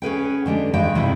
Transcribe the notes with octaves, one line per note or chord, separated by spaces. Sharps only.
C#4 G#4 B4 G5
D3 G#3 D4 G4
G2 E3 G#3 G5
C3 D#3 G3 E4